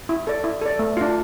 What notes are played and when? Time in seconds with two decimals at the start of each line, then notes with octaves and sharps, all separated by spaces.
0.09 E4
0.27 A4 D5
0.44 E4
0.61 A4 D5
0.79 A3
0.97 D4 F4